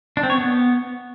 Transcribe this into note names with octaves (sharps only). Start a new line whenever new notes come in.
D4
C4
C#5
B3